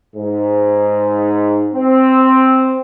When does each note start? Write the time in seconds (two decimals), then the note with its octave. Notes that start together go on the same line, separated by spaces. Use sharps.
0.16 G#2
1.74 C4